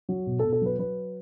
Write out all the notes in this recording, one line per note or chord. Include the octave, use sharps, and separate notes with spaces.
F#3
B2
A4
B2
A4
F#3 B4
F#3 B4